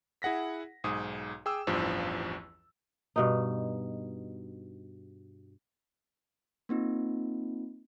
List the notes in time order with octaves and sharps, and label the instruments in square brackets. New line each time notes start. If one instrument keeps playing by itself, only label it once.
[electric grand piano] E4 G#4 F#5 A#6 B6
B1 G#2 G#4 D#6
G#4 G5 D6 E6
A1 E2 G2 F3
[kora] G2 B2 D#4
[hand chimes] A#3 C4 D#4 F4